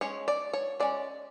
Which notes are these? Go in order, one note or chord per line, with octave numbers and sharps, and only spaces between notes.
G#3 C#4 C#5
D5
C#5
G#3 C#4 D5